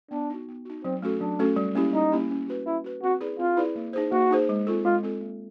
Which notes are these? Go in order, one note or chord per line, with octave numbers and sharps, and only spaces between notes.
B3 D4
D#4 F#4
B3
D#4 F#4
F#3 C4
A3 C#4 F#4 A4
F#3 D4
A3 C#4 F#4 A4
G3
A#3 C#4 E4 G4
G3 D#4
A#3 C#4 E4 G4
C#4
F#4 B4
C#4 E4
F#4 B4
C4 F#4
E4 G#4 B4 D5
C4 F4
E4 G#4 B4 D5
A#3
D#4 G#4 C5
A#3 F#4
D#4 G#4 C5
G#3
C4 F4 A4
G#3 F4
C4 F4 A4
A#3